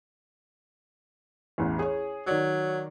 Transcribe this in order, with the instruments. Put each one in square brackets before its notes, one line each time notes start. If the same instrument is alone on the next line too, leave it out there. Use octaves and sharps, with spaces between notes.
[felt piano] A1 E2
G#4 C#5
[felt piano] D#3 D5 [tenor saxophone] F#3